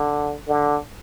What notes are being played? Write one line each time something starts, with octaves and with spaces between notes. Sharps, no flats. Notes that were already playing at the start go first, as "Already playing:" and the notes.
Already playing: D3
D3